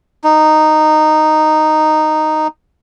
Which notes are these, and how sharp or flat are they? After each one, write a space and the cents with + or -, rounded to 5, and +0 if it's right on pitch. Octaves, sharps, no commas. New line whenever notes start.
D#4 -10